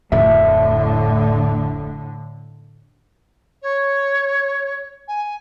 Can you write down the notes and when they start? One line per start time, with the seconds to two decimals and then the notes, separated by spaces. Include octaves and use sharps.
0.12 D1 F2 A2 D3 E5
3.62 C#5
5.07 G#5